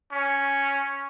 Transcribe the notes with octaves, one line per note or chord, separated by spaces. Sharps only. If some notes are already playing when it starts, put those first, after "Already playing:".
C#4